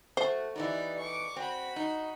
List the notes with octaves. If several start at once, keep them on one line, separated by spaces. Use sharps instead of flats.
A3 F#4 C5
E3 B3 D#4 G4 D5
C#6 D6
C4 F#4 B5
D#4